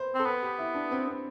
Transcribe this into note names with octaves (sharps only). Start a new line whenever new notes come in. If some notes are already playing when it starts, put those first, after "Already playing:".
Already playing: B4 C5
C4
A4
B3 B4
G4
E4
D4
C4
C4